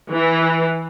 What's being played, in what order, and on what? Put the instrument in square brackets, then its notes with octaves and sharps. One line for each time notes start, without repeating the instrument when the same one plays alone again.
[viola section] E3